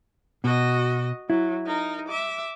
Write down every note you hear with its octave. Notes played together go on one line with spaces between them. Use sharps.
B2 F#4 D#5
F#3 E4
D#4 A#4
E5 D6